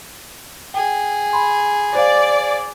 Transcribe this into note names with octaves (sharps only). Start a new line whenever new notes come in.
G#4 G5
B5 C6
C5 D5 F5